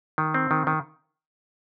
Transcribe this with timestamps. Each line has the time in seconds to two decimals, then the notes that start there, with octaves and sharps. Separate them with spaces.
0.18 D#3
0.34 C4
0.51 D#3
0.67 D#3